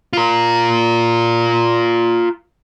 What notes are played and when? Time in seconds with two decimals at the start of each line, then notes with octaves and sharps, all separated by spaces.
0.13 F4 A#4